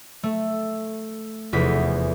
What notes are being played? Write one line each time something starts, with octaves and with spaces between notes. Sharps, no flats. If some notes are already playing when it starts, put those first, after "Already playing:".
A3
F1 E2 B6